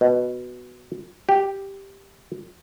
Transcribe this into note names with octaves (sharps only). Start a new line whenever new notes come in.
B2
G4